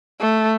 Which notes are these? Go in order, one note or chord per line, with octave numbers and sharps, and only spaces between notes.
A3